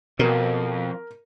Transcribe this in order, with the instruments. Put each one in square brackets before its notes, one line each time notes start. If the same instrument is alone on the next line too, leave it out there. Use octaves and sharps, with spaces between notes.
[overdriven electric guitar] B1 F2 [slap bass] B2 [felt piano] A#4